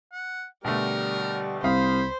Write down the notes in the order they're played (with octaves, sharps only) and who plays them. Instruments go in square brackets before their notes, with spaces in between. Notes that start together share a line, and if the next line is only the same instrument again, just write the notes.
[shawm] F#5
[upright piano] B2 D3 A3 [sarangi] G3 [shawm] A#4
[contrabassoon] C2 [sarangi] C5 [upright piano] F5 D#6 [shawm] B5